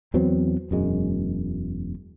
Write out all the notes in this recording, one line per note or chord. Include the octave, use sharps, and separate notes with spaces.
E2 F#3 B3 C4
E1 F#2 G#3